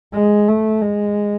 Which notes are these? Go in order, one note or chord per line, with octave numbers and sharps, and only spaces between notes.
G#3
A3
G#3